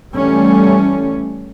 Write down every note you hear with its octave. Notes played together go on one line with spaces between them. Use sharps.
E3 G3 A3 C#4